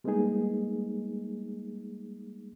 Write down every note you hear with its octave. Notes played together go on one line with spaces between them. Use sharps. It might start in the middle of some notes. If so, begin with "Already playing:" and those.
G3 G#3 A#3 B3 D#4 G#4